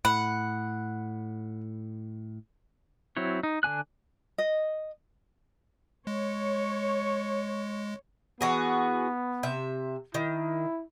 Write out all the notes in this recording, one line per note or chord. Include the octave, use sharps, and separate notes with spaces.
A2 F#5 B5
F#3 C4 E4 C#5
D#4
D3 D4 G#5 F#6
D#5
G#3 C#5
E3 B3 F#4 G#4
C3 E5
D#3 E4